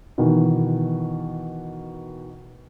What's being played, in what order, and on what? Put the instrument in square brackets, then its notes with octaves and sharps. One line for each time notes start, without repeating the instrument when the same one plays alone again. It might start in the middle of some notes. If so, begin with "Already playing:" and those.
[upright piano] B2 D#3 E3